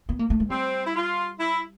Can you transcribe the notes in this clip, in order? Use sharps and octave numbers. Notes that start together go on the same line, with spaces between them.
B3
A#3
A3
G#3
G3 C4
E4
F4
E4